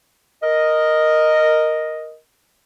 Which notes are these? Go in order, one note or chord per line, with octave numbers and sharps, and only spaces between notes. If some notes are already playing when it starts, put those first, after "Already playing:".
A#4 D#5